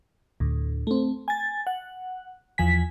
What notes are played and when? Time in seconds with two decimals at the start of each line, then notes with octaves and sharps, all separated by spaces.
0.40 D2 A2
0.87 A3 C4
1.28 G#5 A6
1.67 F#5
2.58 E2 F3 G#5 B6